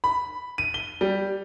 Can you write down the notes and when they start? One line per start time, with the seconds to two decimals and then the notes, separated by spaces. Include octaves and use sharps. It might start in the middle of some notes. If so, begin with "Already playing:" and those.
0.04 B5
0.58 D#7
0.74 G7
1.01 G3